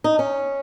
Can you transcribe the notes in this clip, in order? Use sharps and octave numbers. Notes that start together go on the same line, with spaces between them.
D#4
C#4